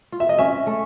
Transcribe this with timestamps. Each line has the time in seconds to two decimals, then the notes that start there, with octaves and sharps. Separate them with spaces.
0.12 F4
0.20 E5
0.29 D#5
0.39 C#4 E5
0.67 A3